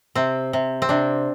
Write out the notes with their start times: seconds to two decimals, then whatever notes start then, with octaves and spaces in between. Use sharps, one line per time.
0.15 C3 C4
0.53 C3
0.82 C4
0.89 C3 D4